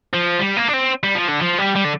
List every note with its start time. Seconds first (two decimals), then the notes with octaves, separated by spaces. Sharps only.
0.13 F3
0.39 G3
0.57 A#3
0.68 D4
0.73 C4
1.03 G3
1.15 F3
1.28 D3
1.41 F3
1.58 G3
1.75 G3
1.84 D3